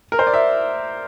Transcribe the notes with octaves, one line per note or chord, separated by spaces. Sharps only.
A#4
C5
D5
E5